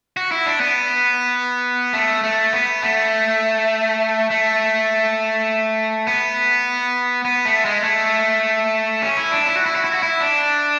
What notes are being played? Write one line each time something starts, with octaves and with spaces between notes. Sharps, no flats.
F#4
E4
D4
B3
A3
A3
B3
A3
A3
B3
B3
A3
G#3
A3
C#4
E4
D4
E4
F#4
E4
F#4
E4
F#4
E4
D4